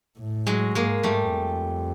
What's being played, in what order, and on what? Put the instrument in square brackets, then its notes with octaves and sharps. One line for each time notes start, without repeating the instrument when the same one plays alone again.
[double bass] A2
[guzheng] F#3 G#3
[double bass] G#2 [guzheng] G#3 A#3
[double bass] G#2 [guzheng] G3 A3
[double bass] F2